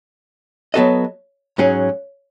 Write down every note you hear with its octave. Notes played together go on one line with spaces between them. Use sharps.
F#3 B3 F#4 A4 D#5
G#2 F#3 C#4 G#4